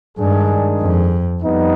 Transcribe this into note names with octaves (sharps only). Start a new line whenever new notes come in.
G2 D#3 G#3 D4 G#4
F2
F2 G3 B3 D#4